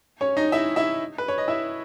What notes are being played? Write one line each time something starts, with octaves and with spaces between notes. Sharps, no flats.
C#4 C#5
D#4 D#5
E4 E5
E4 E5
B4
C#5
D#5
E4 E5